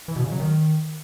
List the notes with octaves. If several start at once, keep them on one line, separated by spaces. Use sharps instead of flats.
E3
B2
C#3
F#3
D#3